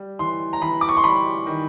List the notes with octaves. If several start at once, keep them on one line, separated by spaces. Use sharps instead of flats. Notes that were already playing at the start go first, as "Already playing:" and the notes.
Already playing: G3
E3 C6
A#5
E3 B5
D6
C#6
C6
G3 B5
D#3